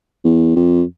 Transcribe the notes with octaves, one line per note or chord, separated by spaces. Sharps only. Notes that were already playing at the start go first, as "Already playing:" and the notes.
E2
F2